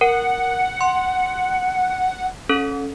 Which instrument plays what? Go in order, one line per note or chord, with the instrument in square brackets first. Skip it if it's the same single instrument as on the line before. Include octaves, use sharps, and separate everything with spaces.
[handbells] A#4 [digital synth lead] F#5
[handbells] C6
C#4 A4